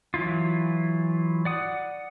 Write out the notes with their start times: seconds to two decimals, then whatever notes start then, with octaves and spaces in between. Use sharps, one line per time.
0.14 E3 F#3 E4 F4
1.45 D5 F#5 D#6